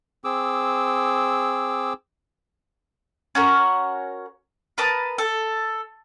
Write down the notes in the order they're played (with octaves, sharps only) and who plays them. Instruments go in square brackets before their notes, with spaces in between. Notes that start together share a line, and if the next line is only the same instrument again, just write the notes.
[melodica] C4 G#4 D6 E6
[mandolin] C#4 F#4 A#4
A#4 B4 A5 D#6
A4